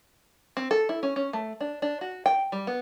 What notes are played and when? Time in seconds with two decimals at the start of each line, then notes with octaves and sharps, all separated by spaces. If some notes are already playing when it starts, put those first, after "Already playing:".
0.57 C4
0.71 A4
0.89 E4
1.03 C#4
1.16 C#4
1.33 A3
1.61 D4
1.82 D4
2.01 F#4
2.26 G5
2.52 G3
2.67 B3